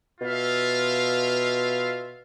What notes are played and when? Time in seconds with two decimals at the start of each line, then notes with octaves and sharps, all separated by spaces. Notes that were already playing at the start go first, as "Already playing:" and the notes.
0.21 B2 F4 E5 F5